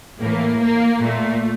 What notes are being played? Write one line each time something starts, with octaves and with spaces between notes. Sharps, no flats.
A2 E3 A#3
A#3
A#2 A3